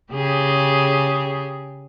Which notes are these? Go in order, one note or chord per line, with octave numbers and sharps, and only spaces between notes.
C#3 G4 G#4